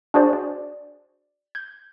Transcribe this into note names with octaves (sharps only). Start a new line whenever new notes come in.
D4 F#4 G#4 C5 D5
D5
G6 G#6